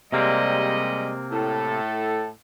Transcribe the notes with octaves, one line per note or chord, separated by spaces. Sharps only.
C3 G3 G#3 A#3 C4 D#5
A2 A4